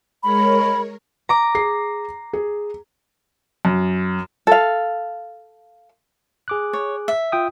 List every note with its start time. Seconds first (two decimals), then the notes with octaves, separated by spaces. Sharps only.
0.23 G#3 A#4 C#5 B5
1.29 A#5 D6
1.55 G#4 C7
2.33 G#4
3.65 F#2
4.47 A4 F5
6.48 G#4 D6 F#6
6.73 C#5
7.08 E5
7.32 F4 G5 D#6